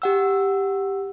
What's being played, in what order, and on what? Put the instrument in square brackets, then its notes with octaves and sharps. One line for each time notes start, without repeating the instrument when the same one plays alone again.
[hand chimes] G4 F#5 E6